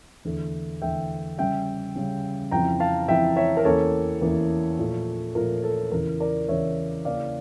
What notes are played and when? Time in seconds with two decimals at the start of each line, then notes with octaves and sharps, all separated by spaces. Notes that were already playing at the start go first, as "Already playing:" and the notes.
0.25 E2 D3 A3
0.82 E2 D3 A3 E5 G5
1.38 C#3 G3 C#4 E5 G5
1.95 C#3 G3 C#4
2.51 F2 C#3 E3 G5 A#5
2.80 F5 A5
3.08 F2 C#3 E3 E5 G5
3.36 C#5 E5
3.57 A#4
3.65 E2 E3 A#3 C#4 A4 C#5
4.21 E2 E3 A#3 C#4
4.79 A#2 F3 A3
5.35 A#2 F3 A3 A#4
5.64 A4
5.92 E2 C#3 E3 A#4
6.20 A#4 D5
6.49 E2 C#3 E3 C#5 E5
7.05 C#3 E3 A#3 C#4 D5 F5